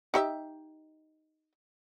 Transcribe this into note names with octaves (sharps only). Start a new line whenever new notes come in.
D#4 G4 E5